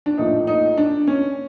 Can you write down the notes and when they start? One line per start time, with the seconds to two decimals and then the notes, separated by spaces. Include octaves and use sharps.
0.06 D4
0.18 A#1 A2 F3 A3 D#4
0.47 D#4
0.78 D4
1.07 C#4